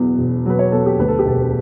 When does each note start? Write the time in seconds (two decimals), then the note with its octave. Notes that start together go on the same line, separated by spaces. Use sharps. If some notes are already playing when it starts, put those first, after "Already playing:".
Already playing: E1 E2 B2 F#3
0.18 E1
0.46 F#3 B4
0.59 C#5
0.72 B2 A4
0.86 G4
0.99 D2 B4
1.08 A4
1.19 G4
1.26 E1 A4